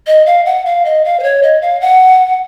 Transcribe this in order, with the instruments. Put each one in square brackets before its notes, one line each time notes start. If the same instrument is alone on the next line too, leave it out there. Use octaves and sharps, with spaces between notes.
[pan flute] D#5
F5
F#5
F5
D#5
F5
C5
C#5
D#5
F5
F#5